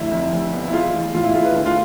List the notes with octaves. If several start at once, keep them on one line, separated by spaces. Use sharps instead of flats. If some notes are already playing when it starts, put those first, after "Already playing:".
Already playing: F1 D2 E4
F2
F1
B3
E4
G#3 F4
A1
A2 F4
E4
G#3 F4
B4
D2 A4
F4